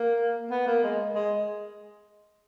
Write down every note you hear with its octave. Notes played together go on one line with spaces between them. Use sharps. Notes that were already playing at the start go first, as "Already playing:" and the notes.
Already playing: A#3
B3
A#3
G#3
G#3